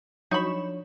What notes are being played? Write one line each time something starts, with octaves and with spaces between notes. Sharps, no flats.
F3 F#3 D4 D#4 C#5 B5 C#6 E7